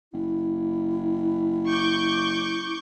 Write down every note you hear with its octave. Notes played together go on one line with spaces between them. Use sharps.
F#1 E4
C#6 D6 G6